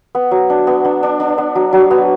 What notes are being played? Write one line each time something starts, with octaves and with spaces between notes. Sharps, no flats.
B3
F#3
D4
B3
D4
D4
D4
B3
F#3
F#3
B3